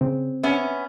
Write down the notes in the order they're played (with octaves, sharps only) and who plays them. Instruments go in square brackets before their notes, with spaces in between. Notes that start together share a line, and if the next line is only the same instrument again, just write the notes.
[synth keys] C#3 [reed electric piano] C4
[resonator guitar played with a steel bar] B3 C#4 [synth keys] E5